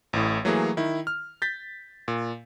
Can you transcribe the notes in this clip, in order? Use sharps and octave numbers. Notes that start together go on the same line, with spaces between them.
A1 A2
E3 F#3 A3 A#3 G#4 C#5
D#3 E4
F6
G6 A6 B6
A#2